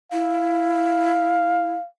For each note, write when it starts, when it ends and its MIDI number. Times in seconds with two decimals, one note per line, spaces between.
0.12 1.75 64
0.12 1.87 77